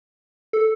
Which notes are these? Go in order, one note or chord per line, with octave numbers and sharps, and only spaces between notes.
A4